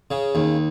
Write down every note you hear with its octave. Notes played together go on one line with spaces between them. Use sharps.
C#3
D#2